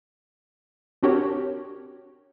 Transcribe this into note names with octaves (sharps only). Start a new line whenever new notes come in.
C4 D4 F#4 G4 A#4 C#5